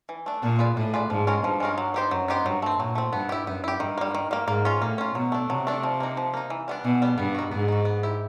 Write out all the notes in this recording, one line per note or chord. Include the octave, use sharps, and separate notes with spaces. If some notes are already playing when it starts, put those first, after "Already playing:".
E3
A3 D4
A#2 D4
F4 G#4 B4 D5
A2 D4
F4 G#4 B4 D5
G#2 F3
G#3 C#4 F4 A#4
G2 F3
G#3 C#4 F4 A#4
F#3
B3 D#4 G4 C5
F#2 F#3
B3 D#4 G4 C5
G2 F#3
A3 C4
A#2 F#3
A3 C4
G2 B3
E4 G4
F#2 B3
E4 G4
G2 D#3
G3 A#3
D#3
G3 A#3
G#2 A#3
C#4 F4
A2 A#3
C#4 F4
B2 F#3
A3 D4
C3 F#3
A3 D4
F3
A#3 D#4
F3
A#3 D#4
E3
G3 B3 D4
B2 E3
G3 B3 D4
G2 B3
D#4 F#4
G#2 B3
D#4 F#4
B3
E4 G4